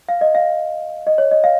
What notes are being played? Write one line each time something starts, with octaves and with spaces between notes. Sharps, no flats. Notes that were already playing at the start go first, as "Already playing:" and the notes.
F5
D#5
F5
D#5
C#5
D#5
F5